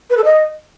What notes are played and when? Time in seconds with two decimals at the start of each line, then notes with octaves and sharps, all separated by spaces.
0.10 B4
0.17 A4
0.24 D#5